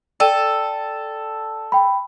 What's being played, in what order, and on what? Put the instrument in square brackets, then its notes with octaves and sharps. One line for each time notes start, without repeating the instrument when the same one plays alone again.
[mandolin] A4 [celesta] D5 G5 D#7
[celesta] G5 B5